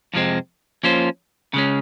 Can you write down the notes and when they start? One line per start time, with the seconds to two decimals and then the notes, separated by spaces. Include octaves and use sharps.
0.14 F2 C3 F3 G#3 C4
0.83 F3 A#3 C#4 F4 C5
1.54 C#3 G#3 C#4